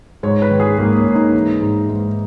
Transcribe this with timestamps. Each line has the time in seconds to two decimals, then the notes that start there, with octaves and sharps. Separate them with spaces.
0.23 G#2 C#5
0.42 B4
0.51 D#3
0.60 G#4
0.78 G#2 A#3
0.97 C#4
1.07 G#2
1.15 D#4
1.34 E3
1.62 G#2
1.89 G#2